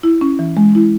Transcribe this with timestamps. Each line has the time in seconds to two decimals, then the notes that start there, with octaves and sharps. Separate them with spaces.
0.03 E4
0.21 C#4
0.39 E3
0.57 G#3
0.75 E4